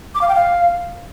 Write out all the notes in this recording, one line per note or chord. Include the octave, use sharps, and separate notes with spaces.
D6
F5
G5
F5